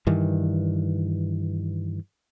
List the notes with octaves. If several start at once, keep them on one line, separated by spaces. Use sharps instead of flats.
G2 D#3 E3